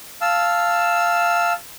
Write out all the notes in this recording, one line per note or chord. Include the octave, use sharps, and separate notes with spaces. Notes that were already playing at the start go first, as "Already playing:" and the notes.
F5 A5 E6